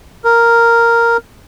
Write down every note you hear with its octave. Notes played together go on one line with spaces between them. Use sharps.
A#4